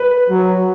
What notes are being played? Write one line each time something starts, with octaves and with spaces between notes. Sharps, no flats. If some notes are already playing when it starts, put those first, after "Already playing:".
Already playing: B4
F#3